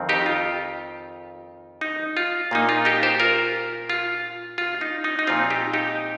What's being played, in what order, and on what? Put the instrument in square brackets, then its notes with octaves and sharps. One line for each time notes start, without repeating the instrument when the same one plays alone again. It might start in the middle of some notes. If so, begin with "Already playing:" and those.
Already playing: [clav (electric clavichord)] F2 D#3 C4
D#4 G4
F4
D#4
F4
A#2 A#3 D#4
F4
D#4 G4
G4 C5
F4 A#4
F4
F4
D#4
D#4
D#4
A#2 F3 C4 F4
D#4 G4
D#4 G4